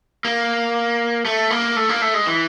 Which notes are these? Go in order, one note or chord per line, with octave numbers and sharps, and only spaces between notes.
A#3
A3
A#3
A3
A#3
A3
G#3
E3